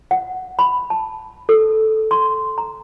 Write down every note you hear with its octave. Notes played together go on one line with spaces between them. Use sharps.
F#5
B5
A5
A4
C6
A#5